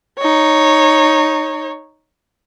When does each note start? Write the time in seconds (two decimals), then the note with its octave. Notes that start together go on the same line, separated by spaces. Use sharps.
0.19 D#4 C#5